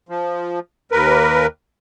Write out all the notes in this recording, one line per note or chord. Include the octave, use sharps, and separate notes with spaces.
F3
D#2 A#4 B4